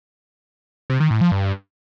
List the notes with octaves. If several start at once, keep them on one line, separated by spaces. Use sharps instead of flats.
C3
D#3
A2
F3
G2